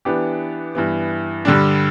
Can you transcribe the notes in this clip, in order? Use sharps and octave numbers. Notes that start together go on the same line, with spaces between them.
E3 B3 D4 G4
G2 E3 B3
G2 D3 G3 D4